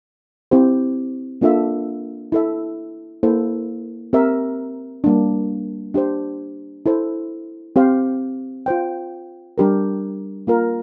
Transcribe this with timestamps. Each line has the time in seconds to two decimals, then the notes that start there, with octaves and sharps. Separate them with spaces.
0.51 C4 E4 G4 C5
1.41 A#3 D4 F4 A4 E5
2.32 E4 A4 E5
3.23 A#3 E4 A4 C5
4.13 C4 G4 A#4 E5
5.04 G3 A#3 D4
5.94 D4 G4 C5
6.86 E4 A4 C5
7.76 C4 G4 C5 F5
8.66 F4 C5 G5
9.58 G3 D4 G4 A#4
10.47 A#3 F4 A#4